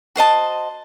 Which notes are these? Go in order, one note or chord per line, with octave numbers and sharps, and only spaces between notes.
F#4 C5 D#5 A5